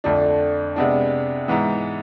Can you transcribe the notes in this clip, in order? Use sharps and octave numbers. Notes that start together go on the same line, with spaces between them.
F2 D3 A3 D4
C3 G#3 B3 D4
G#2 E3 B3